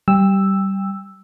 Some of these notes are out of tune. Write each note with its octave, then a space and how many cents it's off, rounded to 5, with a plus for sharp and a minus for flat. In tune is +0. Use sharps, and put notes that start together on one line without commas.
G3 -15 G5 +25 E6 +0